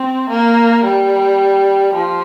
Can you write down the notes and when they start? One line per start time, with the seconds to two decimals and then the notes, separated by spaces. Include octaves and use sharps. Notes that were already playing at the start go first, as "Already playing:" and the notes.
Already playing: C4
0.29 A#3
0.84 G3
1.94 F3